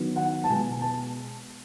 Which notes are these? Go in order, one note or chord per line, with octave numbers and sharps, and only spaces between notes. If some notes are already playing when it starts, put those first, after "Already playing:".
Already playing: D#3 F#3 B3
F#5
A5
B2 G#3 B3 G#5
A5